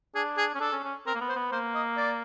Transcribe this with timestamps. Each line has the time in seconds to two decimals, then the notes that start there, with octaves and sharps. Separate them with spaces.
0.15 D4 G#4
0.38 G#4
0.55 C#4
0.60 D4 A4
0.72 C#4
0.84 C#4
1.06 C4 A#4
1.15 A#3
1.21 B3
1.29 C5
1.36 B3
1.52 A#3 C5
1.75 D#5
1.97 D5